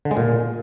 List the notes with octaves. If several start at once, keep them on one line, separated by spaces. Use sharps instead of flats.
D3
G#3
A#2